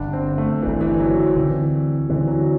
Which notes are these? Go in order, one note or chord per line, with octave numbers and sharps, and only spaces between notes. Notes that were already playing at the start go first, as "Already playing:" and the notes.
Already playing: G1 G2 D3 D4
C4
A3
G1 G2 D3 E3
E3
F#3
D2 D3 E3 G3 C4
D2 D3 E3 G3 C4
F#3